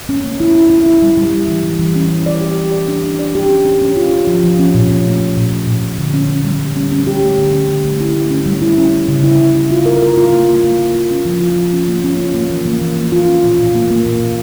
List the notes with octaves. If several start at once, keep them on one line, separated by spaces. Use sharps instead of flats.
C#4
A#3
E4
E4
E4
E4
G3
G3
G3
E3
G3
E3
C#4
G3
D5
G4
G4
D5
D4
D4
D5
G4
C#4
C#4
C#4
F4
C#4
F3
F3
C#4
A#2
C#4
A3
A#2
A#2
A#2
A#2
A#2
D3
C#4
C#4
G3
G3
C#4
C#4
G4
A3
D3
C#4
D3
A3
E4
A3
C#4
G3
E4
C#4
C#4
C#3
E4
C#3
E4
F4
A#4
A#4
F4
A#3
A#3
A#3
A#3
F4
C#4
F3
F4
F3
C#4
A#3
C#4
F4
A#3
E3
A#3
E3
A#3
F4
C#4
A#2
A#2
A#3
A#3
A#2
A#2